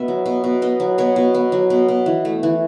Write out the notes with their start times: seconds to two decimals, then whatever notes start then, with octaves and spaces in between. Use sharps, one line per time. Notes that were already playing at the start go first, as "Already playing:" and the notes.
Already playing: B2 B3 E5
0.08 F#3
0.26 B2
0.44 B2
0.62 B3 D#5
0.80 F#3
0.98 B2 C#5
1.16 B2
1.34 B3
1.52 F#3
1.70 B2
1.88 B2
2.06 E3
2.25 A3
2.43 E3